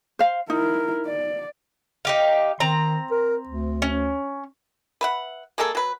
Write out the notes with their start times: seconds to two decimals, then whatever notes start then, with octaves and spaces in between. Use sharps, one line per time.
0.19 C5 F5
0.50 D#4 E4 A#4
1.06 D5
2.05 D#4 G4 F5
2.60 D#3 C4 A#5
3.11 A#4
3.48 D2
3.82 C#4
5.01 B4 E5 F#5
5.58 G#3 A#3 G#4 A4
5.75 F#3 B4